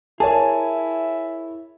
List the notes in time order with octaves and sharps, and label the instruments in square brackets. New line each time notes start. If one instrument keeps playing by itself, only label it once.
[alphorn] E4 [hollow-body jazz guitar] G#4 [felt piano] A#4 C#5 [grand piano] G#5 A5